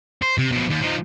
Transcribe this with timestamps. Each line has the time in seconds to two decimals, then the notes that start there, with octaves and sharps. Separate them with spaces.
0.22 C5
0.38 C3
0.52 B2 F3
0.70 D#2
0.82 F3 D#4